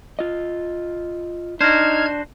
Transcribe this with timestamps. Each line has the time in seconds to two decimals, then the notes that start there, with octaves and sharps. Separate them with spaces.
0.19 F4 D#5
1.61 D4 D#4 F#4 C5 F6 G#6